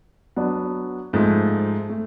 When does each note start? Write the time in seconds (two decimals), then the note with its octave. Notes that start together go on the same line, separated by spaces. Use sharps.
0.36 F#3 B3 D4
1.13 G#2 F3 A3
1.89 A3